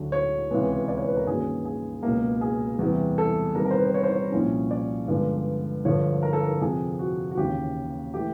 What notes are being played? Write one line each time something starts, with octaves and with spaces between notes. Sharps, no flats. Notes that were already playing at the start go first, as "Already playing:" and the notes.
Already playing: D2 D3 F#3
C#5
C#2 C3 E3 G#3 B3
D5
C#5
B4
A#4
G2 D#3 F#3 A#3 C#4 G#4
G#4
C#2 B2 F#3 A#3
G#4
E2 C3 E3 G3
A4
C3 D#3 G3 B3 A#4
A#4
C5
B4
C5
C#5
C5
C#5
C2 A#2 F3 A#3 C#4
D5
G2 D3 F3 G#3 B3
G2 D3 F3 C#5
A#4
A4
A#4
F2 C3 F3 G#4
F#4
F#4
D#2 C#3 E3 G4
E3 A3 G4